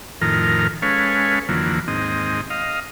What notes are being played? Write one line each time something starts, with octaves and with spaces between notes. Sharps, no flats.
F2 A2 D#3 A#4 F6
G#3 C#4 A4 B4 C#5 F5
F2 D3 E3 F#3 A#3
D#2 G#2 C4 D#5
D#5 F5